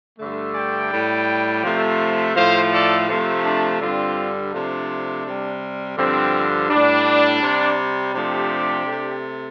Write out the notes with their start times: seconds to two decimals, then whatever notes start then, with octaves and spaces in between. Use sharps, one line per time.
0.19 G2 D3 A3
0.54 D5 G5
0.91 A2 G3
1.64 C3 F3 A3
2.35 A2 F3 A3 C5 F5
2.72 A4 D5
3.08 C3 F3 A3
3.45 D4
3.80 G2 D3 G3 C4 F4
4.52 C3 F3 A3 D4
5.25 C3 G3
5.98 G2 D3 F3 C4
6.70 A2 G3 D4
7.43 C3 G3
8.14 C3 F3 A3 D4 G4
8.87 C3 A3